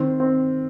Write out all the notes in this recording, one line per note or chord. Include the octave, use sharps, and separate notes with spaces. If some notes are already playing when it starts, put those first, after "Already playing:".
Already playing: D#3 C4
C4